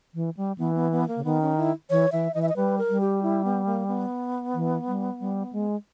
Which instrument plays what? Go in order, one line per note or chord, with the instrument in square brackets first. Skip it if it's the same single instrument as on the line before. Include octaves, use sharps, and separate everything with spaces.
[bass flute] E3
G3
[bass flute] E3 [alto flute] B3
[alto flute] B3
B3
A#3
[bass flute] C#3
[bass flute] D#3 [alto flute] B3
[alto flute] C#4
E4
[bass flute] E3 [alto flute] C#5
[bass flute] E3 [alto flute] E5
[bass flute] E3 [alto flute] D#5
[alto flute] E5
D#5
[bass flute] G3 [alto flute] B4
[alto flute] A#4
[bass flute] G3
[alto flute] G4
E4
B3
A#3
B3
[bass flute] E3
G3
G3
G#3